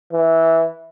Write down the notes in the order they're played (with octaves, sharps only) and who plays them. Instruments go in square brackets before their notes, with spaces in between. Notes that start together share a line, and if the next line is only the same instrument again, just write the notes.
[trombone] E3